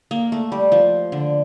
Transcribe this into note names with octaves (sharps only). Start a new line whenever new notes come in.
A#3
A3
G3
F3
D3